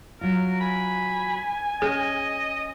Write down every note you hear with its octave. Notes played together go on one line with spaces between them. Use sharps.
F#3 F4 A#4
G#5 B5
C#4 G#4 D#5